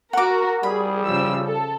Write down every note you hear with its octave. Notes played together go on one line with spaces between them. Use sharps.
F#4 A#4 F#5 D6
G3 G#4 B5
C#3 F3 E6
A4